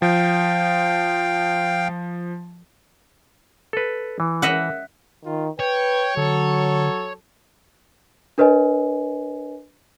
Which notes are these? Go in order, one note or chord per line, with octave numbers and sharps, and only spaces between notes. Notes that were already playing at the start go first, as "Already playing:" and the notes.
F3 F5 G5
A4 B4
E3
D#5 E5 F#5
D#3 F4
B4 C#5 G5
D3 F#3 A4
D4 A#4 B4 C#5 D#5 G#5